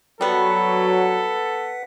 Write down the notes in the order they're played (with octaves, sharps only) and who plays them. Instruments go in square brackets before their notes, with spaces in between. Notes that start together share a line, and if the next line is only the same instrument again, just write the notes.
[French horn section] F#3 [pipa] G3 B3 [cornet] A4 [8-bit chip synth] B4 F#5 B6